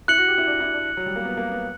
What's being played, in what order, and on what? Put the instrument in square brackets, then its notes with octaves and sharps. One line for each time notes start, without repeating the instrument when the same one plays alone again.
[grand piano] E4 [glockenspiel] F#6 C#7 F#7
[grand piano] F#4
G4
E4
D4
E4
D4
F#3
G3
A#3
B3
A#3
B3